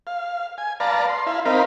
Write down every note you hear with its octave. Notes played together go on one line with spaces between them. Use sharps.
F5
G#5
B4 D5 F5 A5 A#5
C6
E4 F5
C4 D#4 A#4 F5 B5